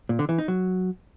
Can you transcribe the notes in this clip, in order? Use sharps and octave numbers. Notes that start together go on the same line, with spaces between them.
A#2
D3
E3
D#4
F#3